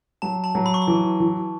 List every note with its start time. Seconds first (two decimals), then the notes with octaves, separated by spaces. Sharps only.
0.22 F#3 A5
0.44 A5
0.55 F#3
0.66 B5
0.74 C#6
0.82 B5
0.87 E3
1.20 E3